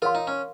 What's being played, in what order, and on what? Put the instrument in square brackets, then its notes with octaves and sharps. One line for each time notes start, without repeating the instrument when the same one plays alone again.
[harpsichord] F4 [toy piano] A#4 C#5 F5 C6
[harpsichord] D#4
C#4